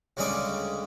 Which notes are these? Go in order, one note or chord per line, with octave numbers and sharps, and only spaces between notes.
D2 C#3 G3 G#3 G#4 D6